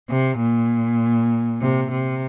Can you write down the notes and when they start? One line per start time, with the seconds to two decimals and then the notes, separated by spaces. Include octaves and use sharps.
0.10 C3
0.41 A#2
1.61 C3
1.91 C3